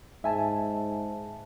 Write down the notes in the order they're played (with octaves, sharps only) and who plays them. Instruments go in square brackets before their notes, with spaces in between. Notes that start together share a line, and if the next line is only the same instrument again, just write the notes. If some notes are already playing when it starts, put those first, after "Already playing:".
[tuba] G#2 [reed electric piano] E5 G#5 A5